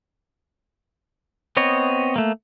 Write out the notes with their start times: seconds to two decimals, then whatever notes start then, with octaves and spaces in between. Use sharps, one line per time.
1.57 B3 C4 C#5 D#5
2.16 A3 A#3